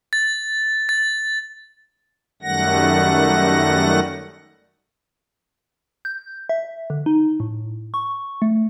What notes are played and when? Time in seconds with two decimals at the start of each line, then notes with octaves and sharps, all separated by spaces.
0.13 A6
0.89 A6
2.42 F#2 D#3 G3 A3 F#5 A#6
6.05 G6
6.49 E5
6.90 D3
7.06 D#4
7.40 A2
7.94 C#6
8.42 A3